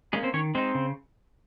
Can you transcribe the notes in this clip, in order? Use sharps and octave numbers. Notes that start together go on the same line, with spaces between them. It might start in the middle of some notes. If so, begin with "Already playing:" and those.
G#3 A#3 C#4 G#4
C4 C5
D#3 C#4 C#5
G#3 C4 D#4 C5
C#3